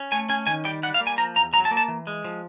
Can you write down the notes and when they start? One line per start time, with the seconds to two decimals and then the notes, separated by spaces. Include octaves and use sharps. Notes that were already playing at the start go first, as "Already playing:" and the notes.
Already playing: C#4
0.12 A3 G#5
0.29 C#4 G#5
0.47 D#3 G#5
0.65 G3 G5
0.83 G3 F#5
0.94 F5
1.00 A#3
1.07 G#5
1.18 F3 A#5
1.36 E2 A#5
1.53 F#3 A#5
1.65 A5
1.71 A#3
1.77 A5
1.88 E3
2.07 G#3
2.24 F3